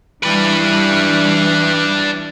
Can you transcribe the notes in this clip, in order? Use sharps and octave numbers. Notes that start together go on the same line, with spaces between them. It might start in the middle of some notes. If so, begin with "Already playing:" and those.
E3 G3 D4 B4